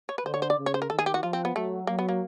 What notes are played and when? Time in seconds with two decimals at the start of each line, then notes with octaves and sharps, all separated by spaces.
0.09 C#5
0.18 B4
0.26 D3 C5
0.34 C#5
0.42 C5
0.50 D5
0.58 C#3
0.66 C#5
0.74 C5
0.82 A#4
0.90 D#3 A4
0.99 G#4
1.06 G4
1.14 F#4
1.23 F3 F4
1.33 C4
1.45 B3
1.55 F#3 A3
1.87 F#3 A#3
1.99 B3
2.09 A#3